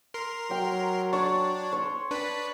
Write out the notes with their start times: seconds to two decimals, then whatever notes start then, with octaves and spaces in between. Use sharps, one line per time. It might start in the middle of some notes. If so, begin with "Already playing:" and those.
0.14 A#4 C6
0.51 F#3 G5
1.13 D4 C#5
1.73 C#5 C6
2.11 D4 B4 B5